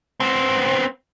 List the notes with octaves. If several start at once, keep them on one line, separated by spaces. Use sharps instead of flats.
B3 C4